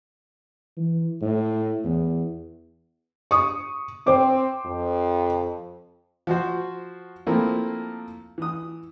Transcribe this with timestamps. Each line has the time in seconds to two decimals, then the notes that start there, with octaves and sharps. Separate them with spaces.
0.77 E3
1.22 A2
1.84 E2
3.31 C#6 D#6
4.07 C4 C5 G5 D6
4.65 F2
6.27 F3 F#4 C5
7.27 F3 A3 A#3 C4 E4
8.38 E3 D#6